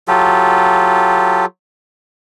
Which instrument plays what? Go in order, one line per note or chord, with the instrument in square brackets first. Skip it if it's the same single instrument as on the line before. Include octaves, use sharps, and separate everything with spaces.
[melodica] F#3 F4 G4 A4